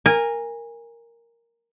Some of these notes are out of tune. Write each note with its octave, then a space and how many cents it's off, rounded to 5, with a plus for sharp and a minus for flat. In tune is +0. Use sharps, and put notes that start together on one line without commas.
A#4 +0 G#5 -20